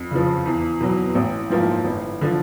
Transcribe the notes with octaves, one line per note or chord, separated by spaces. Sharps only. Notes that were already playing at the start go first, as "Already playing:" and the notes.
Already playing: F2
C#3 F3
E2
B2 F#3
A1
G#2 F3 A#3
G1
D3 F3